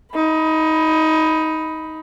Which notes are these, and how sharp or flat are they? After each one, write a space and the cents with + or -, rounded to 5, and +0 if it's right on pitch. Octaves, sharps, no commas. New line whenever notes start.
D#4 +15 B5 +0